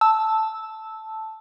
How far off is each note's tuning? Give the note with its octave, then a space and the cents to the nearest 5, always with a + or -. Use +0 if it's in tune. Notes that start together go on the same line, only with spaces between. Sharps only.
A5 +0 E6 -10